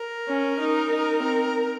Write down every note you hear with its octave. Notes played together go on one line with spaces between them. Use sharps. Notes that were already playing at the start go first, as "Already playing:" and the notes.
Already playing: A#4
C#4
D#4
D#4
C4